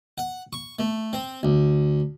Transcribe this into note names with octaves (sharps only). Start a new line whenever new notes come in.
F#5
C#6
A3
C4
D2